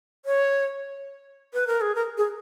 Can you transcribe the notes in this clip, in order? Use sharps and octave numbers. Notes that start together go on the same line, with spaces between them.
C#5
B4
A#4
G#4
A#4
G#4